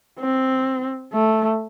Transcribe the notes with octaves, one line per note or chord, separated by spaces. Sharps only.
C4
A3